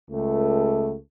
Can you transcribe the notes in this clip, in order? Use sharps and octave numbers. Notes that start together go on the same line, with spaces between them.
C#2 A3